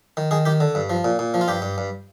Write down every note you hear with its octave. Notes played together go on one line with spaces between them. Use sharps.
D#3
D#3 G#4
D#3 G4
D3
G2
F3
A#2
A#2
F3
F4
G2 G4
G2
G2